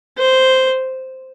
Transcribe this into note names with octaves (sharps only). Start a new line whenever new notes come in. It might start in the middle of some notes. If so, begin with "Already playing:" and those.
C5